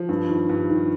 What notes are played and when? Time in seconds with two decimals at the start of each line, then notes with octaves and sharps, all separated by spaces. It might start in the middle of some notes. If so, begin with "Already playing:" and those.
Already playing: F3
0.09 G2
0.29 D#3
0.49 G2
0.70 D#3